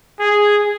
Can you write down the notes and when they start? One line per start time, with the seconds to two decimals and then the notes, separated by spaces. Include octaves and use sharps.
0.20 G#4